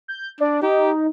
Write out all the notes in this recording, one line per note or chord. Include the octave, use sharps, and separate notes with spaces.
G6
D4 D5
D#4 G4